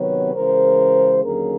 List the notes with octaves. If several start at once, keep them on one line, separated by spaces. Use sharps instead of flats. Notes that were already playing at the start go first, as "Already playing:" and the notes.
Already playing: C3 D#3 F#3 B3 B4 C#5
C#3 E3 G#3 A#4 C5
D#2 D3 F#3 A#3 C#4 G#4 A#4